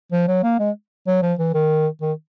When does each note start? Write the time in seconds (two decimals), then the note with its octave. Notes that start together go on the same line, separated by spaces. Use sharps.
0.12 F3
0.28 F#3
0.44 A#3
0.59 G#3
1.07 F#3
1.22 F3
1.39 E3
1.54 D#3
2.01 D#3